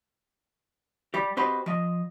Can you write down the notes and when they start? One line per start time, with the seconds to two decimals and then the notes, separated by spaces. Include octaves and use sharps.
1.14 G3 G4
1.37 C4 F#4 G4 B4 C5 D#5
1.66 F3 D#5